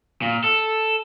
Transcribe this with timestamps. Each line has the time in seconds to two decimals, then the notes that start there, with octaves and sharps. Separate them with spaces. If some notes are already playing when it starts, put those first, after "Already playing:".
0.22 A#2
0.44 A4